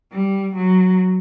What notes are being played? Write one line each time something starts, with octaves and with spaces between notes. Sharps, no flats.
G3
F#3